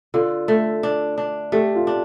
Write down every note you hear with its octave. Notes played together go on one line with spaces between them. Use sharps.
D3 F4
A3
D4
D4
A3 G4
F4
D4